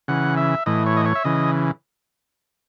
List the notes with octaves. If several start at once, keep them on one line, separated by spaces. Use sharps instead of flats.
C#3 E3 F#5
E5
A2 E3 D#5
C#5
D#5
C#5
E5
C#3 E3 D#5